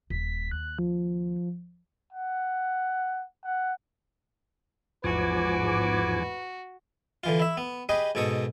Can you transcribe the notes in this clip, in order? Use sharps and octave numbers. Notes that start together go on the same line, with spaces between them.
D#1 B6
D#2 F#6
F3
F#5
F#5
A1 E2 G#2 F3 F#4 B4 G#5 D6
D3 E3 F4
E4 E5
B3
G4 G#4 B4 D#5
G#2 B2 A4 C#6 D#6